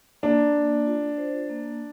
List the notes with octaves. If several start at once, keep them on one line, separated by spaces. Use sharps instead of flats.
A#3 D4
A#3
F4
C5
A#3